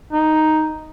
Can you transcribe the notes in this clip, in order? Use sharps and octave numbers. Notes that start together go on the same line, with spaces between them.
D#4